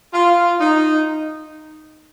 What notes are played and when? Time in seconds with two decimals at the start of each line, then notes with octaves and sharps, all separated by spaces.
0.14 F4
0.60 D#4